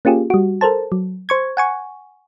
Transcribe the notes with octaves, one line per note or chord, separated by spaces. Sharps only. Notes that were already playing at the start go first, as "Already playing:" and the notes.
A#3 C#4 F4 G4 G#4
G3 F#4
A4 A#4 C5 A5
F#3
C5 C#6 G#6
F#5 G#5 C#6